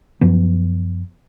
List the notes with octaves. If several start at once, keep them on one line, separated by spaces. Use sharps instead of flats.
F#2 F3 B3